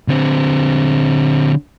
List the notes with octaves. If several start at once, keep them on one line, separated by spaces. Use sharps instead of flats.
D3 C4